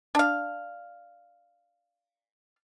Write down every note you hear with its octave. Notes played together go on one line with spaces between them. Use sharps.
D4 F5